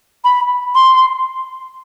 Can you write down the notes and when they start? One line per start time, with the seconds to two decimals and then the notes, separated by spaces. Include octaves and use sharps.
0.24 B5
0.75 C6